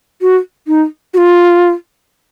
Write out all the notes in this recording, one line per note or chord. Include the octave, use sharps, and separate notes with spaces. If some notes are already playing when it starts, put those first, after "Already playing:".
F#4
D#4
F#4
F4